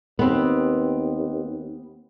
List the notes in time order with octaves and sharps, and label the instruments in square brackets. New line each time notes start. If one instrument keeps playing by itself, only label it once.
[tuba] D#2 [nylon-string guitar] B3 C4